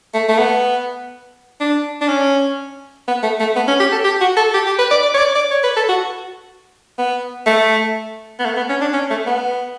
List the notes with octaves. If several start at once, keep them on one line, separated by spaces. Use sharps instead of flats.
A3
A3
B3
D4
D4
C#4
B3
A3
A3
B3
C#4
G4
A4
G4
F#4
A4
G4
G4
B4
D5
D5
C#5
D5
D5
C#5
B4
A4
F#4
B3
A3
B3
A3
B3
C#4
D4
C#4
A3
B3